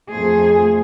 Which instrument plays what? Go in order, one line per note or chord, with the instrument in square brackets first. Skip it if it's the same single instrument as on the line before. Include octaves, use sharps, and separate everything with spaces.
[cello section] F2 A3 G#4 C5